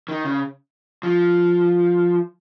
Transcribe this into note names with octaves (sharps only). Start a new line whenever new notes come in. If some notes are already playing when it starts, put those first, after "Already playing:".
D#3
C#3
F3